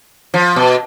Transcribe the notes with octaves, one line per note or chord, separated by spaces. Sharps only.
F3
B2